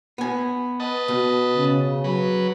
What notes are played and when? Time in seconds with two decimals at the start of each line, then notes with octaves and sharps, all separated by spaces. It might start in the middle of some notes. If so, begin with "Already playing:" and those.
0.18 B3 G#5
0.80 B4 D#5 A5
1.08 B2
1.56 C#3
2.04 F#3 B4